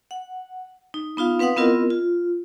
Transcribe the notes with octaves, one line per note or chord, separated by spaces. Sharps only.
F#5
D#4
B3 D#4 F4 F5
C4 B4 F5 F#5 D#6
B3 C4 E4 F4 A#4 D#5
F4